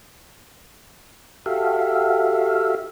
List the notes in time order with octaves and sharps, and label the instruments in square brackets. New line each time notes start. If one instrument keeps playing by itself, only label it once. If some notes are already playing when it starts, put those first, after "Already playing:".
[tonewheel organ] F#4 G4 A4 E5 F5